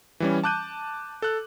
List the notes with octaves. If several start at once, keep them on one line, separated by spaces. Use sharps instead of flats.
E3 G3 C#4
A5 D6 F#6 G6 D#7
A4 F#6